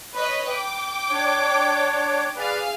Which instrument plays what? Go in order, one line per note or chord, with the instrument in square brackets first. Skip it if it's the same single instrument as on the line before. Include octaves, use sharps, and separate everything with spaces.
[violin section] B4 C#5 D#5
G5 D6
[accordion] D4 C#5
[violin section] G#4 F5 [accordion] B4 D5